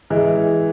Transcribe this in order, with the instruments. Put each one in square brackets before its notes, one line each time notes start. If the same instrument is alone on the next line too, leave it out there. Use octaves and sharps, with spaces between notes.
[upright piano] E3 G#3